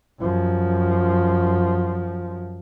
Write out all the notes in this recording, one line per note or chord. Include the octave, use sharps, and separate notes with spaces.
F#2 F3